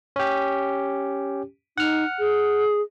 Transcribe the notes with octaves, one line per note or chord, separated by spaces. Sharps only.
C#4 G4
D#4 F#5 F6
G#4